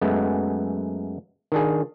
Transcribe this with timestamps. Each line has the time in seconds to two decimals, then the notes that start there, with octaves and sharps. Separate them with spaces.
0.01 F#2 G#3 A3 B3
1.52 D#3 D4 G#4